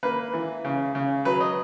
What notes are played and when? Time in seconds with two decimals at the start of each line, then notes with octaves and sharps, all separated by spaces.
0.03 A#3 B4
0.34 E3
0.65 C#3
0.95 C#3
1.25 F#3 B4
1.41 D#5